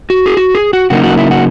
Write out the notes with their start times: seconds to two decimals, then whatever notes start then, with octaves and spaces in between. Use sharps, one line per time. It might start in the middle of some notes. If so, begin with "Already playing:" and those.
0.10 F#4
0.26 G#4
0.37 F#4
0.55 G#4
0.73 F#4
0.90 C#3 F#3 A#3 D#4 F#4
1.04 F#4
1.18 E4
1.31 F#4